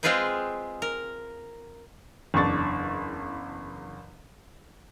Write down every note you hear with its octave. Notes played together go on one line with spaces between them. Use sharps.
G#3 C4 F4 G#4 B4 G5
A#4
F#1 E2 D4 C#6 A6